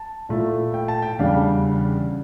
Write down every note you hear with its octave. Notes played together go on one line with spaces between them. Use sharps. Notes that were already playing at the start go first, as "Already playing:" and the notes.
Already playing: A5
A#2 A3 E4
G5
A5
G5
E2 C#3 G3 D4 F5